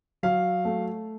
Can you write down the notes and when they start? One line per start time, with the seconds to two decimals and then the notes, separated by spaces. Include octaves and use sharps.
0.23 F#3 F5
0.65 A3